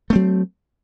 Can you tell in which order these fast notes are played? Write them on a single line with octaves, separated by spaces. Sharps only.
A3 C4 F#3